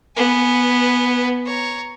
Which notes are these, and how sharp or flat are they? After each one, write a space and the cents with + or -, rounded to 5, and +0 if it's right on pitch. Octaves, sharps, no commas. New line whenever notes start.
B3 -5 G#5 +5
C#5 +0 A#5 +0